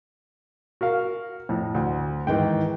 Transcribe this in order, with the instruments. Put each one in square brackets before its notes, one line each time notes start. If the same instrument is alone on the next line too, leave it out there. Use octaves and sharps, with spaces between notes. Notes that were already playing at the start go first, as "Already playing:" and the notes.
[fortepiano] F#4 A#4 F5
F2 A2
D2
[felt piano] G#2 D#3 E3 [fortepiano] G5